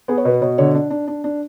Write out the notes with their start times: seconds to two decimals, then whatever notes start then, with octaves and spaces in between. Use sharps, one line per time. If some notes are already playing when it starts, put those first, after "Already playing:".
0.08 B3 G#4
0.18 C#5
0.25 B2 B4
0.41 B2 C#5
0.58 D3 C#5
0.75 D4
0.90 D4
1.08 D4
1.24 D4